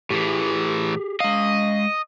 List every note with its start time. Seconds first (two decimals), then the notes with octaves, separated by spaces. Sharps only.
0.10 A2 E3 G4 G#4
1.20 G#3 D#5 F5